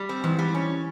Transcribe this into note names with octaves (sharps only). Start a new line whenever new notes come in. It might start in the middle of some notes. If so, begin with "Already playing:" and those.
Already playing: G3
C4
G#2 E3
G3
C#4